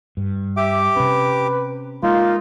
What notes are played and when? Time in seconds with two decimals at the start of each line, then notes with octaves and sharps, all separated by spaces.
0.17 G2
0.57 G4 E5 D6
0.97 C3 C#4 B4
2.03 G#3 A#3 D#4 F4